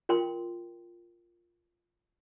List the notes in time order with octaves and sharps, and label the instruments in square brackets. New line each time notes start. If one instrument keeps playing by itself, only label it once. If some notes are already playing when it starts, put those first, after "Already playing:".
[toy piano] F4 A#4 G5 C6